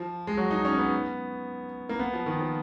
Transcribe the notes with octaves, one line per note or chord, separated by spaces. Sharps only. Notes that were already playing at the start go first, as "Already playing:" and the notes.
Already playing: F3
G#3
F#3
D#4
C#4
B3
A#3
B3
F3
D#3
F3